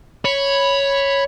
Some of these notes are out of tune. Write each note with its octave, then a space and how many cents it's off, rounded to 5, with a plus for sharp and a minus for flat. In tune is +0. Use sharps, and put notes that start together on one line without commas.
C#5 +0 B5 +0